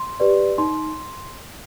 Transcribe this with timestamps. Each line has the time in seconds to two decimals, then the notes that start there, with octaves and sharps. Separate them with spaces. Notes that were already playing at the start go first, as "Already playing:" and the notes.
Already playing: C6
0.20 G4 B4 D5
0.58 D#4 C6